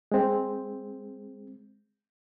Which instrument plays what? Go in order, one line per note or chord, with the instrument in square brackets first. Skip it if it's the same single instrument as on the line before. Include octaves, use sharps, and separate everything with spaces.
[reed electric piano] G#3 C4